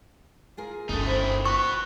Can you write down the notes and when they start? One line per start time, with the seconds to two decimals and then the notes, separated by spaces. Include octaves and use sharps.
0.57 F4 G#4 A#4
0.89 G1 A3 C#4 D#4 E4 G4 A4
1.07 D#3 E4 C5 G5
1.45 F#4 B4 C#6